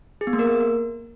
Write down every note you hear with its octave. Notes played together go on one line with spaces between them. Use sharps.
G#4
B3
A#3
A#4